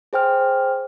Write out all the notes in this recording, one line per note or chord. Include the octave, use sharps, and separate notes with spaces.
G#4 C5 G5 F6